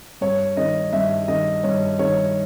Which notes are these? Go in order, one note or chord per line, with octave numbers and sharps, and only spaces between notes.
G2 C#5
D#3 D#5
G2 E5
D#3 D#5
G2 C#5
D#3 C#5